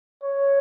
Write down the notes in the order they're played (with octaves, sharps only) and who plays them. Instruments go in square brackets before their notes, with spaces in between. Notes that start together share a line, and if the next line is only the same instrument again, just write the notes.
[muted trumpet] C#5